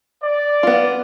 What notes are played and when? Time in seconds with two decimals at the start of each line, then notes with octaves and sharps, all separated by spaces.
0.23 D5
0.63 B3 F4